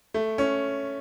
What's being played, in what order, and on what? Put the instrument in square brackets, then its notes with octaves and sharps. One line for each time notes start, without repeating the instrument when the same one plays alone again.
[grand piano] A3
C#4